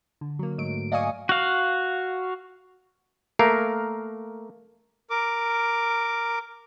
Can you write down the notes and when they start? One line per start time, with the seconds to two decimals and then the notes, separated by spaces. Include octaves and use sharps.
0.21 D3
0.39 F#3 A#3
0.58 G#2 F#3 A3 D7
0.92 D5 D#5 F5 G#5 C#6 D#6
1.29 F#4 F5
3.39 A3 A#3 A#4 F5
5.10 A#4 D6